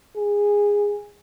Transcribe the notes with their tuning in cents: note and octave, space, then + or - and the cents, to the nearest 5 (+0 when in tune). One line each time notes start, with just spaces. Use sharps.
G#4 -15